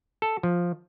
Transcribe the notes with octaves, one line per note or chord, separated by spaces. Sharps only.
A4
F3